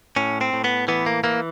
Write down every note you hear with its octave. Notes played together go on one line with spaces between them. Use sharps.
A2 C#4
C4
A2
B3
E3 B3
A#3
E3 A#3